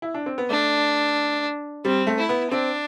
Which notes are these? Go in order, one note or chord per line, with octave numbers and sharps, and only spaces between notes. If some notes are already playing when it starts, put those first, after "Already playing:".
E4
D4
C4
B3
A3 D4
G3 C4
A3
E4
B3
C4 D4